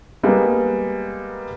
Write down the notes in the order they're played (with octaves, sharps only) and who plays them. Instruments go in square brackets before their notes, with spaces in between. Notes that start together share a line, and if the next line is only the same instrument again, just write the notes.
[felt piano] G3 G#3 A#3 B3